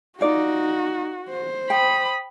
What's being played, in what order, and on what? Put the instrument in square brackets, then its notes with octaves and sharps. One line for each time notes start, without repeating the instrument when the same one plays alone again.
[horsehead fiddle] D#4 [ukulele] F4 D5 [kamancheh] F#4
[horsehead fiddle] C5
[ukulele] G5 [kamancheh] B5 D#6